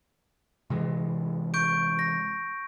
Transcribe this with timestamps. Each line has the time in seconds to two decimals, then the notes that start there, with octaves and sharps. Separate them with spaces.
0.70 C3 E3 G#3
1.54 C#6 G6 D7
1.99 A#6